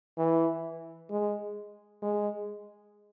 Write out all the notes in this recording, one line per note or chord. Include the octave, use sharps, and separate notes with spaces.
E3
G#3
G#3